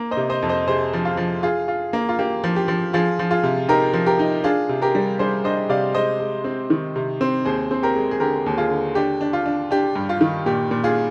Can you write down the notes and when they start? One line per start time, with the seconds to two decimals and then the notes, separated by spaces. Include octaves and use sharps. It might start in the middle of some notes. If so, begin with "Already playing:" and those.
Already playing: A#3
0.11 C5 D#5
0.17 C3
0.30 C5 D#5
0.42 F2
0.49 C5 D#5
0.68 C3 G#4 C5
0.93 F3
1.05 F4
1.17 F3
1.43 F4 G#4
1.68 F4
1.93 A#3
2.09 F4
2.19 A#3 G4
2.44 F3
2.56 G4
2.68 F3
2.93 F3 F4 G#4
3.19 F3
3.31 F4 G#4
3.43 C3
3.68 D#4 G4 A#4
3.93 F3
4.06 G4 A#4
4.19 D#4
4.44 D4 F4 G#4
4.69 C3
4.82 G4 A#4
4.95 G3
5.19 G3 G#4 C5
5.44 D4 C5 D#5
5.69 C3 D5 F5
5.95 G#3 C5 D#5
6.20 G#3
6.44 C4
6.70 D#3
6.96 C3
7.21 C4
7.45 D#2 G#4 C5
7.71 C4
7.83 G4 A#4
7.96 G#3
8.11 G#4
8.20 D3 G4 A#4
8.46 D#2
8.58 F4 G#4
8.70 D3
8.95 D4 G4
9.21 D4
9.33 F4
9.46 D4
9.71 D4 G4
9.96 G2
10.09 F4
10.21 D#3
10.46 A#2 G4
10.71 A#2
10.84 F4 G#4